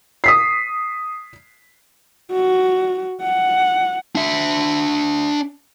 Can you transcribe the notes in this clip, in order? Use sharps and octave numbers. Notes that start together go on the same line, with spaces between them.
D#6 B6 C7
F#4
F#5
D4 E5